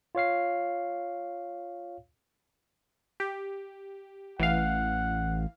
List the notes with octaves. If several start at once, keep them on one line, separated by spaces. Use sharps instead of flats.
F4 C#5 F5 C7
G4
A1 E3 F5 F#5